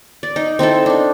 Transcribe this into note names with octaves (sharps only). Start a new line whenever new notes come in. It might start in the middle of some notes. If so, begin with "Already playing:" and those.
D5
D#4
C4 D#4 E4 A4
D4 D#4